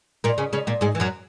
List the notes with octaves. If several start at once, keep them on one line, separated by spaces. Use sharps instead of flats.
A#2 A#3
C#3 C#4
C#3 C#4
A#2 A#3
G#2 G#3
E3
F#2 F#3